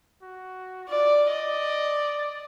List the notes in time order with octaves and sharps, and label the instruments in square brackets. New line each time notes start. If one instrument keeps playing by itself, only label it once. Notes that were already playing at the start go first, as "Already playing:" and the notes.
[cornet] F#4
[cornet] F4 [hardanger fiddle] D5
[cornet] D5 [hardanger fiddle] D#5